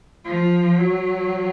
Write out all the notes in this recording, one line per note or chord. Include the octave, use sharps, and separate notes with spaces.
F3
F#3